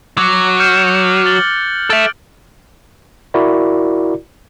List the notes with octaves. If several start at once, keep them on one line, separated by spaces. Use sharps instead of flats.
F#3 D6 F#6
F6 G6 C#7
A6 F#7 G7
A4 E5 D7
E4 F#4 A#4 D5